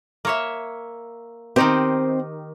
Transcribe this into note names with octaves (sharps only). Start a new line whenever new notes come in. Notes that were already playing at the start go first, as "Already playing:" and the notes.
A#3 C#5 E5
D#3 C4 D#4 G4 C5